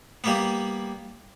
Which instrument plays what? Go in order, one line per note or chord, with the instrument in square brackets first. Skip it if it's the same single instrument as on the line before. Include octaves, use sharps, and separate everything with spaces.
[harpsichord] G3 A#3 B3